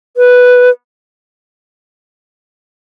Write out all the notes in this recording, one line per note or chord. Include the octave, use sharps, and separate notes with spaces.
B4